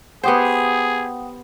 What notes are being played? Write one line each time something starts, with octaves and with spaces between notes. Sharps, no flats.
B3 G4 G#4 C5 F#5 G5 D#6